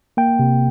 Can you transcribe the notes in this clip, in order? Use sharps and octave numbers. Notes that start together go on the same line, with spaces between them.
A#3 G5
C3